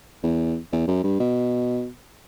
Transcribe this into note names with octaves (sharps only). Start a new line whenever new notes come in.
E2
E2
F#2
G2
B2